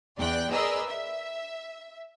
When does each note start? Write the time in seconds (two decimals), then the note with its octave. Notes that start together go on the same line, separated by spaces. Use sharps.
0.17 E2 D5 G5 F#6
0.51 G#4 A#4 B4 D5 D#5 E6
0.88 E5